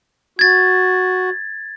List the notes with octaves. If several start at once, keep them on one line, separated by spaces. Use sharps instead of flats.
F#4 G#6 A6